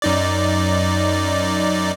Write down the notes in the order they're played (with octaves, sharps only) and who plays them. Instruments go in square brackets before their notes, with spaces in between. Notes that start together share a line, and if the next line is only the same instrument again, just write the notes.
[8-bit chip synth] F#2 D#4 D5